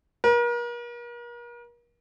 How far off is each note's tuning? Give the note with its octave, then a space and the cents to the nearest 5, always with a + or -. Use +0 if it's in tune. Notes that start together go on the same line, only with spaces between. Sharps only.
A#4 +40